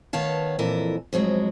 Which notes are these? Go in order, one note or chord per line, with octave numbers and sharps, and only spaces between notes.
D#3 B3 C#5 F5 A5
F2 A#2 E3 A4 A#4
F2 G#2 F#3 G#3